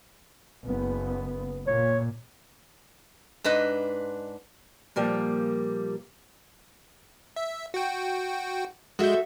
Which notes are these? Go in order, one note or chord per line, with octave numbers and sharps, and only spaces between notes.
F#1 B3
A#2 C#5
G#2 D4 B4 D#5
A#2 F3 G3 A#3
E5
F#4 G5
G#3 F#4 A4 E5 G6